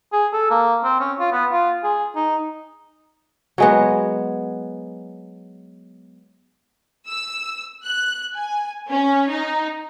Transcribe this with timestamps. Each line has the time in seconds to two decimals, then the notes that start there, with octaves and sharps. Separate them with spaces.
0.12 G#4
0.33 A4
0.50 A#3
0.84 C4
1.00 C#4
1.19 F4
1.32 B3
1.51 F4
1.83 G#4
2.15 D#4
3.58 F#3 G#3 B3
7.09 E6
7.85 F#6
8.37 G#5
8.89 C#4
9.32 D#4